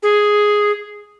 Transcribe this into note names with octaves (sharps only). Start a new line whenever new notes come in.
G#4